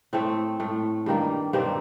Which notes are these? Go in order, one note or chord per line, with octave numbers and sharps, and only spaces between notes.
A2 A3 C4
A2 A3
G2 D#3 G3 A#3
G2 D#3 G3 A#3 C4